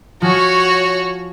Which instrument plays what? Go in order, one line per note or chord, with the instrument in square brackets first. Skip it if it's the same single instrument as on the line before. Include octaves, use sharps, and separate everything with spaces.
[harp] F3 G#5 [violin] F#4 C#5